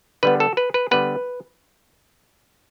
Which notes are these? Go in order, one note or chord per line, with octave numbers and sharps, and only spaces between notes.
D3 G3 B3 B4
A4
B4
B4
D3 G3 B3 B4